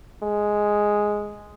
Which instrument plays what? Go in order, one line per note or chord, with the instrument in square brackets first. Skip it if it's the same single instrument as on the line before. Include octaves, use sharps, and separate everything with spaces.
[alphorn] G#3